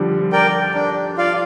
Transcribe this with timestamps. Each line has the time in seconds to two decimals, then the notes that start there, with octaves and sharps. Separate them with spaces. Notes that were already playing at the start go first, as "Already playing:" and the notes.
Already playing: D3 F3 G3
0.32 A#4 D5 G5
0.75 D4
1.17 F4 D5 F5